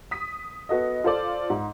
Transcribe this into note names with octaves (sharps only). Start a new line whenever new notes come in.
D#6 B6
B3 F#4 A4 D#5
F4 A4 C5 D5
G#2